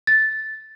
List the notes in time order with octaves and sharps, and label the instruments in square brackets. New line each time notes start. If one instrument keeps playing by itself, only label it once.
[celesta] A6